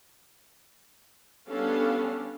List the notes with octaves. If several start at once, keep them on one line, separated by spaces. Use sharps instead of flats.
G3 B3 C#4 D4 A4 F5